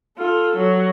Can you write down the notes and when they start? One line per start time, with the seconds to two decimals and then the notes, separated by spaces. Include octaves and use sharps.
0.17 F4 A4
0.57 F#3